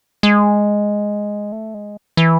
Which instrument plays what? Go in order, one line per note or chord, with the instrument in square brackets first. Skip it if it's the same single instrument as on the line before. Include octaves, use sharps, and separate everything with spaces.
[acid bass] G#3
A3
G#3
E3